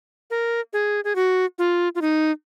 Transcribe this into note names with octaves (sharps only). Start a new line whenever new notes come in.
A#4
G#4
G#4
F#4
F4
F4
D#4